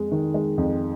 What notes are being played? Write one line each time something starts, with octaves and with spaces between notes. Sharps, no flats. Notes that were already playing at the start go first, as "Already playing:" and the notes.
Already playing: F2 G#3
D#3
G#3
F2